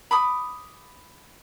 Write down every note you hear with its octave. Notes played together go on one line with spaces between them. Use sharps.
B5 D6 D#6